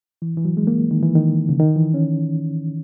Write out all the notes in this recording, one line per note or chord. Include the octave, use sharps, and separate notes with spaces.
E3
E3
F#3
G#3
A#3
D#3
E3
D#3
C#3
D#3
E3
C#4